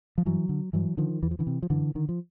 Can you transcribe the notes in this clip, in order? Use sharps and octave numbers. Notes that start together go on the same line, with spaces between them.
F3
G2 E3 F#3
D3
G2 E3 F#3
D3 D#3 F3
E2 E3
F3
D3 E3
C3
F3
F#2 D3 E3
D3 D#3
F3